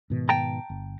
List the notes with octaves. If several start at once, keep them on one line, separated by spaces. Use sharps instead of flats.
G#2 B2 D#3
G5 A5 A#5
G1